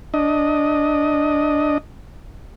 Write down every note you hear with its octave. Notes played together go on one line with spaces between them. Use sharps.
D4 D#5